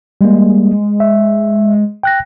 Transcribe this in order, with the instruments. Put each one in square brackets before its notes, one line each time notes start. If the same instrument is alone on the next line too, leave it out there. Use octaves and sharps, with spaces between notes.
[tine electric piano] G3 A#3 [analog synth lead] G#3
[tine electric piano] E5
G5 F#6 A#6